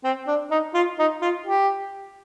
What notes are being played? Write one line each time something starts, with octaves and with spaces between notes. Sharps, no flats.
C4
D4
D#4
F4
D#4
F4
G4